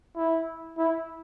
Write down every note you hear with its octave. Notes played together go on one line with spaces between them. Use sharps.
E4
E4